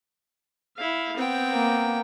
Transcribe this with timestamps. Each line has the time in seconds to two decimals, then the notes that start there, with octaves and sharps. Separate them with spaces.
0.77 E4 F5
1.17 B3 C4 G5
1.51 A#3